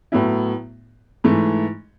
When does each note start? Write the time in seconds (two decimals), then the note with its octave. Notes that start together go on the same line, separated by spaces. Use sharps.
0.12 A2 F#3 B3 E4
1.24 G#2 E3 A3